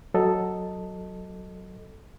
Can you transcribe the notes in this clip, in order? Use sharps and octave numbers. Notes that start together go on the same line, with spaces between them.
F#3 A4 D#5